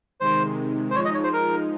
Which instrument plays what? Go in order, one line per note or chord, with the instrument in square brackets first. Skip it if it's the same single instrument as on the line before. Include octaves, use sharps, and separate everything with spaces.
[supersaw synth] C3 D#3 G#3 [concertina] C5
[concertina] C5
[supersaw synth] F3 G#3 D#4 [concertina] C#5
[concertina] D#5
C#5
C5
A#4